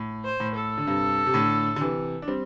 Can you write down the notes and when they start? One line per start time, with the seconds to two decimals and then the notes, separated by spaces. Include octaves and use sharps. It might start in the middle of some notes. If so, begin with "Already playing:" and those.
Already playing: A2
0.24 C5
0.40 A2
0.55 A4
0.78 D3
0.87 G2 C3
1.26 C3
1.34 A2 D3
1.76 D3
1.80 C3 E3
2.22 D4
2.28 G3 C4